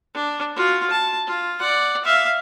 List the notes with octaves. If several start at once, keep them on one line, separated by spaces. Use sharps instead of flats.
D4
F4 F#4
A5
F4
D5 F#5
E5 F5